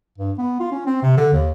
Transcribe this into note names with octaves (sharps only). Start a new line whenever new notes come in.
G2
B3
F4
C#4
C4
C3
D3
D#2